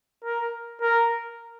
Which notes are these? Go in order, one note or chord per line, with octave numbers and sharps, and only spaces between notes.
A#4
A#4